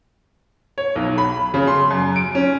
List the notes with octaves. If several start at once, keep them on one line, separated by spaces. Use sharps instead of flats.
C#5
B1
B5
C#3
C6
F#2
D7
C#4